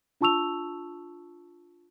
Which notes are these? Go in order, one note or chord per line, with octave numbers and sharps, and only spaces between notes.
D4 F4 A5 C#6 E6 F7